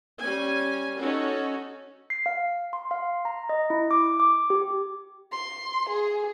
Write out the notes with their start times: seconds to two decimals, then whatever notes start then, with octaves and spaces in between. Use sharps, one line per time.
0.19 G3 C#4 G#5
0.97 C#4 D#4 F#4 A4
2.10 C7
2.26 F5
2.73 C6
2.91 F5
3.25 A#5
3.49 D#5
3.70 E4
3.91 D6
4.20 D6
4.50 G4
5.32 C6
5.89 G#4